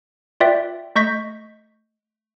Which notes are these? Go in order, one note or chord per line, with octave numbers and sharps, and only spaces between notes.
F4 B4 D5 E5 G5
A3 D#5 C#6 G6 A#6 B6